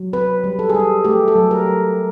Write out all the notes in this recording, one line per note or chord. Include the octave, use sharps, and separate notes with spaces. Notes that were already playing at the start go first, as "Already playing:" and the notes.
Already playing: F#3
C4 B4
G3
A4
G#4
G3 A4
A3 G4
A4
F#3
A#4
F#3